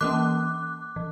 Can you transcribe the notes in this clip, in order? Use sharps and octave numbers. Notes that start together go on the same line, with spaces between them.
E3 A#3 C#4 D6 F#6
E3